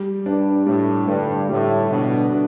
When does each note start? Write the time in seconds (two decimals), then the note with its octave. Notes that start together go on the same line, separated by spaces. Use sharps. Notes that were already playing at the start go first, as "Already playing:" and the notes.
Already playing: G3
0.26 G2 D4
0.66 A2 G3
1.08 G2 D3
1.49 A2 G3
1.90 B2 D4
2.32 D4